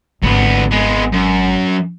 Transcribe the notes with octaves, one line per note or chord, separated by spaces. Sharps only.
G#1 D2 B3
G#3 B3
F#2